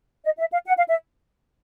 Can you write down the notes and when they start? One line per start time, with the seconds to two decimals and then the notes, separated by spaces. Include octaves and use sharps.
0.25 D#5
0.39 E5
0.52 F5
0.67 F#5
0.77 F5
0.88 E5